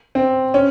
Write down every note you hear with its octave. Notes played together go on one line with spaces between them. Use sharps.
C4
C#4